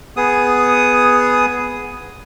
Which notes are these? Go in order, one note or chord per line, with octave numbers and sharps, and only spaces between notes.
B3 G#4 D#6